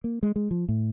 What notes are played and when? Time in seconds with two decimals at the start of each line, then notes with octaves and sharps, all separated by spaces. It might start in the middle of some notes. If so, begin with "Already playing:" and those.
0.04 A#3
0.23 G#3
0.36 G#3
0.51 F3
0.69 A2